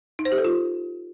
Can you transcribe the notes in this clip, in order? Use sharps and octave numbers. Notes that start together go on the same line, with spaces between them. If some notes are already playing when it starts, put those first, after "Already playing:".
D#4
C5
G4
A4
F4